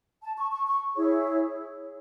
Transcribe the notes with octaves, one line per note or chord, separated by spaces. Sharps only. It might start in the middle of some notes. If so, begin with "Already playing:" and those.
A5
C#6
C#6
C#6
E4 G#4 C#5